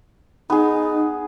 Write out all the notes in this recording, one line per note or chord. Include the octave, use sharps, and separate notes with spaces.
B3 D#4 G#4